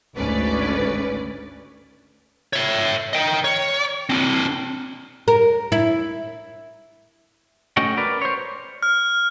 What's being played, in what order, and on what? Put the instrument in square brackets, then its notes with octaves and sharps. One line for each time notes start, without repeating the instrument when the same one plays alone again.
[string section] G#1 D2 G#2 C#4 B4 D5
[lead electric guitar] C#5 E5
D#5 G5
C#5
C4 D4
[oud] A#4
E4
[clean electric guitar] A3 C#4 F#4 D#5 F#5 G5
A#4 B4 D5
C5 C#5
[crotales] F6